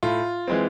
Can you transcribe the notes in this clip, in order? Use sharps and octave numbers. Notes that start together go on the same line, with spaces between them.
A2 F4
E3 G#3 C4